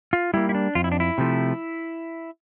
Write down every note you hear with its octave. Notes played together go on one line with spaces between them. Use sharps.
F4
G3 A#3 E4
E4
D4
F2 F4
E4
D4
E4
C3 F3 A3